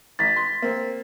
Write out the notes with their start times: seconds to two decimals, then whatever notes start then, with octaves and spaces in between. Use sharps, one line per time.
0.19 A1 A6 B6
0.36 C6
0.62 A#3 C4